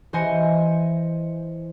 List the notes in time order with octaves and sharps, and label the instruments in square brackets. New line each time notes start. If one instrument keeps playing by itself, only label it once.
[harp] E3 C5 D#5 G#5 C#7